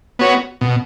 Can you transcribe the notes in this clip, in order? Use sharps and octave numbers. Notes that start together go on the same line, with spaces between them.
B3 F#4 C#5
B2